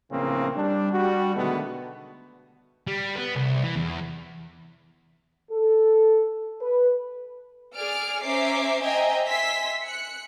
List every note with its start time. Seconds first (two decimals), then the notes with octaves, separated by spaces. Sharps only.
0.11 A#1 A2 C#3 E3 A#3 C4
0.56 G3 D4
0.93 G3 F#4
1.35 B2 D3 D#3 G#3 A3 B3
2.87 G3
3.15 B3
3.36 C2
3.63 E3
3.76 E2
5.51 A4
6.61 B4
7.75 G#4 D5 F6 D7
8.22 C#4 C5 E5 A#5 D6 C7
8.83 C5 D#5 E5 G5 G#5 A#5
9.26 E5 G#5 C6 E6 B6
9.83 F#6 C#7